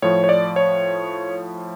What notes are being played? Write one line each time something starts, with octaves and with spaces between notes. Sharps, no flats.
A2 F3 C#5
C#5
D5
C#5